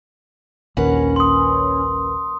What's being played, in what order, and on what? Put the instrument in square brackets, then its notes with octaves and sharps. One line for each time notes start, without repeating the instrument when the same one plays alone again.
[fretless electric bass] A#1 D#2 [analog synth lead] C#4 [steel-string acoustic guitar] A#4 B4 F#5
[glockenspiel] C6 D#6